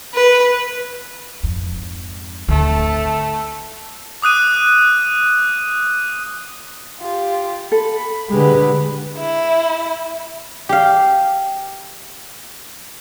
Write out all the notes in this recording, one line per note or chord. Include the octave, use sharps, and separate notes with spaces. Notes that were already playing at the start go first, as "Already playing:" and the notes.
B4
F2 G#2
G#1 D2 A3 A5
D6 D#6 F#6 D#7
F4 G4
A4 B5
D3 G#3 G4 B4
E4
G4 F5